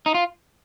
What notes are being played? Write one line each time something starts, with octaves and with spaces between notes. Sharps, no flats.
D#4
F4